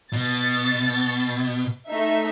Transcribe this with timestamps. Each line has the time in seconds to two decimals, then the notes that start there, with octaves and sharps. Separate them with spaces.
0.13 B2 A6
1.88 A3 D#4 E5